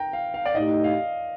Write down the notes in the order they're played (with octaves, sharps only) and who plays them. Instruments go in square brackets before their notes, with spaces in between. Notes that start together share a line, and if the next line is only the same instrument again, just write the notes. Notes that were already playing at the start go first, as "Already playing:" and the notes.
Already playing: [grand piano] G5 A#5
F5
F5
D5
[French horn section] A2 A3 D#4 G4 [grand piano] D#5
[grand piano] F5